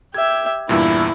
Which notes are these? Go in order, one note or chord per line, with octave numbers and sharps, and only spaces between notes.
G4 E5 G#6
E2 G2 A#2 E4